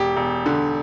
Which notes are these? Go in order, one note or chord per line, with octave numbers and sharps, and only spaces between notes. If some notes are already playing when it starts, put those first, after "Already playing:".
Already playing: E1 G4
E1
D3